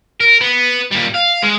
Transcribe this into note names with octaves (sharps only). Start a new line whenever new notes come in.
A#4
B3
A#2 G3
F5
G#3